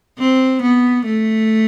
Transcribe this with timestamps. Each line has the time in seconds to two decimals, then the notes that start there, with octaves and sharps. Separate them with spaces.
0.19 C4
0.62 B3
1.06 A3